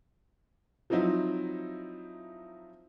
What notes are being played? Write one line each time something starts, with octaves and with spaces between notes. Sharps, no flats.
F3 F#3 C4 D#4 E4